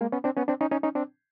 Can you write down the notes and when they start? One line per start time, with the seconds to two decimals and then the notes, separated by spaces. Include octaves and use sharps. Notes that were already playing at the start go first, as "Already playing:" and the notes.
0.01 G#3 A#3
0.12 B3 C#4
0.24 C4 D4
0.37 B3 C#4
0.48 C4 D4
0.61 C#4 D#4
0.71 C#4 D#4
0.83 C#4 D#4
0.95 C4 D4